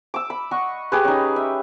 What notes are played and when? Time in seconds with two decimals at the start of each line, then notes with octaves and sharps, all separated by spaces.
0.14 D6 E6
0.30 B5
0.51 D#5 F#5 C#6
0.92 G4 G#4 B4
1.05 C#4 D#4
1.36 E5